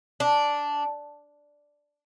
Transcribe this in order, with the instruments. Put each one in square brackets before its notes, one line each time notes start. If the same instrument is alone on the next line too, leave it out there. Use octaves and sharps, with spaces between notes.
[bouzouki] D4